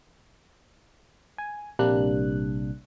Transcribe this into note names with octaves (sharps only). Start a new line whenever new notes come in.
G#5
A#1 C3 G3 A#3 D4 F#6